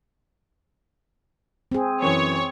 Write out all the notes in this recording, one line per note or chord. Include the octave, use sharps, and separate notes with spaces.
C4 G#4
F#2 E3 C#5